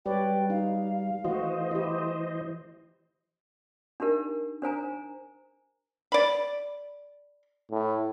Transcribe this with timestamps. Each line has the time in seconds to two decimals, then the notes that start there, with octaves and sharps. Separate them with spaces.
0.06 G3 B4 C#5 D5 G5
0.50 D#4 F5
1.24 E3 A3 F#4 C5 D#5
1.71 E4 G4
4.00 D4 D#4 G4 A#4
4.62 D4 C5 G#5 A#5
6.12 D5 B5
7.71 A2